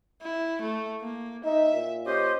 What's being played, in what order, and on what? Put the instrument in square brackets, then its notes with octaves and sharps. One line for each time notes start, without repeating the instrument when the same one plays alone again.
[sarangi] E4
A3
A#3
[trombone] D#4 [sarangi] E5
[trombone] A#2
[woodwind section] C#4 G4 C5 [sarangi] D#5